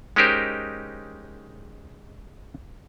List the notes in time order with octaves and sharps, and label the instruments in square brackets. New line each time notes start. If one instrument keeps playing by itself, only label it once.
[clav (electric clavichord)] G#3 C#4 D#4 G4 A#4 C5